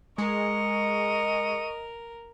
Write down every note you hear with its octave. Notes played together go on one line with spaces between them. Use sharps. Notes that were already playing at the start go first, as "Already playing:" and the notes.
G#3 A#4 D#5 C#6